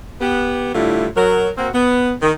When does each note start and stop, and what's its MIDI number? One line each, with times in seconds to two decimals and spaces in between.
0.21 0.71 59
0.21 0.71 67
0.74 1.07 45
0.74 1.07 50
0.74 1.07 55
0.74 1.07 57
0.74 1.07 64
0.74 1.07 65
1.16 1.50 54
1.16 1.50 70
1.58 1.68 58
1.58 1.68 60
1.58 1.68 66
1.74 2.13 59
2.22 2.32 51